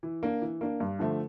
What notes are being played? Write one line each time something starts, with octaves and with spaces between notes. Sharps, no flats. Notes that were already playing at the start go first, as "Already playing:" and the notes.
E3
A#3 D4
E3
A#3 D4
G2
D3 F3 A3